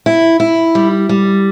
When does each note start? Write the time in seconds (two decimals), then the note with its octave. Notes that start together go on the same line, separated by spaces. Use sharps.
0.06 E4
0.40 E4
0.75 G3
1.09 G3